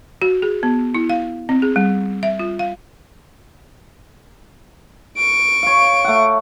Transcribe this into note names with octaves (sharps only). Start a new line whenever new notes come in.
F#4
G#4
B3
E4
F5
C4
G#4
G3
E5
F4
F5
C#6 D7
C#5 F5
A3 F#5